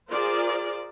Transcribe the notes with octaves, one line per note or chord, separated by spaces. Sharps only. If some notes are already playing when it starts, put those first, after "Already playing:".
F4 G#4 A#4 C5 D5